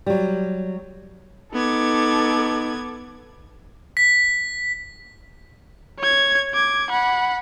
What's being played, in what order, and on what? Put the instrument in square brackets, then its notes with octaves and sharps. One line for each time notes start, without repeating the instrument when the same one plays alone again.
[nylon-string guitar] F#3 G3
[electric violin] B3 G#6 [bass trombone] D#4 [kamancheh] A4 D6
[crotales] B6
[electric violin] C#5 G#6
D6 G#6
F#5 B5